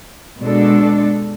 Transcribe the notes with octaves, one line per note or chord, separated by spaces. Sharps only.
B2 G#3 D4 A4